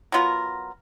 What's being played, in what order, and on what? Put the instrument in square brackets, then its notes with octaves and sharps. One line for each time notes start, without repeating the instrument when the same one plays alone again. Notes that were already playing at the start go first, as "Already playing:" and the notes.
[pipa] F#3 B3 F4 A#4